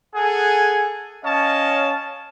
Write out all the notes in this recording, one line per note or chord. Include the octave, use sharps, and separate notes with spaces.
G#4 A4 F#5 G#5
C#4 C#5 D#5 F5 A5